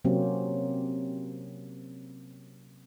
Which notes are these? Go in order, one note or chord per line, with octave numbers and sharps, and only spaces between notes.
C3 F#3 A#3 C4 C#4